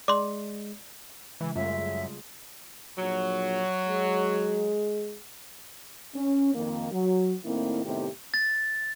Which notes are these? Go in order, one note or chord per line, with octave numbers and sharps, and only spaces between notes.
G#3 D5 C6 D6
C#3 E3 G#3
F#2 G3 A3 F4 E5
G#4
A#1 F#3
G#3
C#4
F2 D#3 A#3
F#3
A2 D#3 A#3 C4 E4
A2 C3 D#3 B3 G4
A6